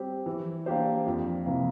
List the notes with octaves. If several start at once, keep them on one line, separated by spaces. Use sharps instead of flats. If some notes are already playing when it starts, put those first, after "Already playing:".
Already playing: G3 C4 G4
E3
A#3 D4 G4 C5
F2
C3 E3 A#3